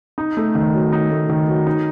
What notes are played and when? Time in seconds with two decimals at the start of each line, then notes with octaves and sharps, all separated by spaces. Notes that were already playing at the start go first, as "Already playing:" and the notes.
0.18 D#4
0.37 A3
0.55 D#3
0.74 F#3
0.92 D#4
1.11 A3
1.29 D#3
1.48 F#3
1.67 D#4